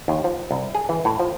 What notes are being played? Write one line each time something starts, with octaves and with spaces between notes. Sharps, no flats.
D#2
F3
C2
G#4
E3
A2
F3